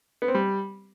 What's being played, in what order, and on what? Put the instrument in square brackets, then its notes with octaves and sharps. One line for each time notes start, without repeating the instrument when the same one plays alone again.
[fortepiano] B3
C4
G3